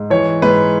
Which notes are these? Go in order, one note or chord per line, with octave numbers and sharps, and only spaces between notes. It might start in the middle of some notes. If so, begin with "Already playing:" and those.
Already playing: G#2
E3 C#5
G#2 B4